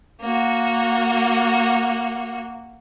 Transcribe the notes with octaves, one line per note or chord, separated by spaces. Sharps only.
A#3 F#4